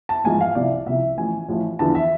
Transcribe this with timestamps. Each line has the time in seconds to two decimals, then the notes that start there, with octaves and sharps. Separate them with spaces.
0.09 A5
0.24 A1 G#2 F3 G#5
0.41 F5
0.55 C2 C3 F3 D5
0.87 C2 C3 F3 E5
1.17 A1 A2 F3 G#5
1.48 A1 A2 F3
1.79 E2 D3 F3 A5
1.95 E5